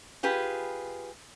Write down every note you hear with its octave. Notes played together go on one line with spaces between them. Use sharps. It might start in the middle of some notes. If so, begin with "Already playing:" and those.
F4 G4 G#4 B4